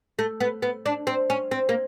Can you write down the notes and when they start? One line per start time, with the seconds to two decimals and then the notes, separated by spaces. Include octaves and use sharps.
0.19 A3
0.40 B3
0.62 B3
0.86 D4
1.07 C4
1.30 C#4
1.51 C4
1.69 A#3